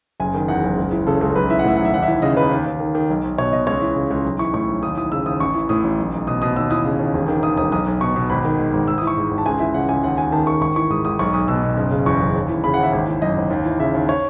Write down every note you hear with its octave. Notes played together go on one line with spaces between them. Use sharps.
F#1 G#5
D#3
E2 F#5
F#1
C#2
E3
C#3 A4
C#2 A4
B1 B4
E3 E5
F#5
A2 E5
B1 F#5
E5
D#2 F#5
E5
E3
C#3 D#5
D#2 B4
D#2
D#2
D#3
D#3
B1
B1
B2 C#5
B2 D#5
C#2 C#5
E3
C#3
C#2
B1
E3 C#6
A2 C#6
B1
D#2 D#6
E3 D#6
C#3 E6
D#2 D#6
A1 C#6
E3
A2 D#6
A1
B1
B1
B2 D#6
B2 D#6
D#2 E6
E3 D#6
C#3
D#2
E1
D#3
D#2 D#6
E1 D#6
B1 D#6
B1
B2 C#6
B2
G#1 B5
D#3
G#2
G#1
G#1 E6
D#6
E3
C#6
G#2
G#1
A5
C#2 G#5
E3 E5
C#3 F#5
C#2 G#5
D#2 F#5
D#2 G#5
D#3 A5
D#3 C#6
G#1 C#6
E3 C#6
G#2 D#6
G#1 D#6
B1 C#6
B1 D#6
B2 E6
B2
F#1
C#3
E2 C#6
F#1
D#2
E3
C#3 B5
F#5
D#2
E5
G#1
E3
F#2 D#5
G#1
D#2
E3
C#3 E5
D#2
C#5